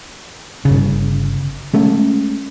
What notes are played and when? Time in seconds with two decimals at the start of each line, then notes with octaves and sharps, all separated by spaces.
0.65 G1 C#3
1.74 G#3 A3 C#4